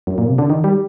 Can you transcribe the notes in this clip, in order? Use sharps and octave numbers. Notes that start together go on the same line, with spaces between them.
F#2
A#2
C3
D3
D#3
G3